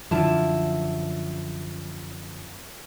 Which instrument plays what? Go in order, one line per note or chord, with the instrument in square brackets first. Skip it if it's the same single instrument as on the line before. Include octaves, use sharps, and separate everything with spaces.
[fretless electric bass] F#2 D3 F3 [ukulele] E4 F4 A5